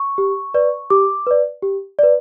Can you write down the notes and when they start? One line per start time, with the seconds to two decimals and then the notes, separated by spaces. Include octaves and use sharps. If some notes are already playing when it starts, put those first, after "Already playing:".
Already playing: C#6
0.18 G4
0.54 B4 D5
0.90 G4 D6
1.27 B4 D5
1.63 G4
1.99 B4 D5